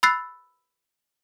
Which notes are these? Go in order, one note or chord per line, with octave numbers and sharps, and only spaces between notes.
B5 E6 F#6 A6 C7